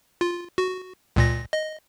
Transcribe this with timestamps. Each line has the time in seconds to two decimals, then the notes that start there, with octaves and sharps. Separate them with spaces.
0.21 F4
0.58 F#4
1.16 C#2 A#2 A#6
1.53 D#5